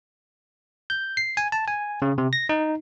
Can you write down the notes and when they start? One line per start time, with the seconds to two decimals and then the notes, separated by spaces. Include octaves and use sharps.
0.90 G6
1.17 C7
1.37 G#5
1.52 A5
1.68 G#5
2.02 C#3
2.18 C3
2.33 A#6
2.49 D#4